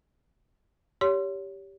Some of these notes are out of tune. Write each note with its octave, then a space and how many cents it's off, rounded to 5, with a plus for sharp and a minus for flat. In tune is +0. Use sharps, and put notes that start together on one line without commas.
G4 +0 C#5 +25 C6 +0